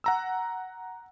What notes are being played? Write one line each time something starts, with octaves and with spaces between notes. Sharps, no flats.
F#5 A#5 E6